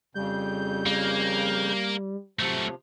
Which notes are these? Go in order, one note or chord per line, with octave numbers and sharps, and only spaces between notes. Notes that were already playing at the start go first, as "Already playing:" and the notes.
F2 C#3 G3 G6
A#3
C3 F3 F#3 A3